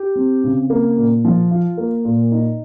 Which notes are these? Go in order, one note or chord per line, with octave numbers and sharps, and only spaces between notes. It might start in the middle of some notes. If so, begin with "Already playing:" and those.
Already playing: G4
C4
C#3
A#3
A#2
F3
F4
A#3
A#2
D#4